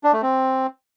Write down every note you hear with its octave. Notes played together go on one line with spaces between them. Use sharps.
D4
A3
C4